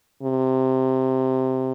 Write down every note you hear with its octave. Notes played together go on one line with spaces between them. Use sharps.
C3